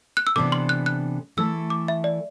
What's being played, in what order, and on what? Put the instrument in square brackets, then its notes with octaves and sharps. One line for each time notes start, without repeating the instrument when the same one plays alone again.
[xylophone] F#6
E6
[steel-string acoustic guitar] C3 E3 B3 D4 A4 [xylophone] D6
[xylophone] C6
F#6
F#6
[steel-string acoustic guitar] E3 A3 E4 A4 [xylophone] E6
[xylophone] D6
E5
D5